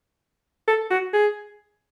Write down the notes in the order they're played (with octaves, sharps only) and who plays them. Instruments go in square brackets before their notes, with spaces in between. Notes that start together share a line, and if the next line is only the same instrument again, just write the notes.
[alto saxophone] A4
F#4
G#4